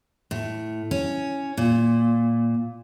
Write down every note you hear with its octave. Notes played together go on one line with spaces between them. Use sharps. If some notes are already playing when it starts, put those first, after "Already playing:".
A2
C#4
A#2